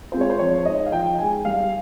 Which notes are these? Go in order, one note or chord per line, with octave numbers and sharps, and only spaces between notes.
G#3 C4 F4 C5
C#5
C5
F3 C#5
G#3 D#4 D#5
F5
F3 G5
G#3 D#4 G#5
G3 F5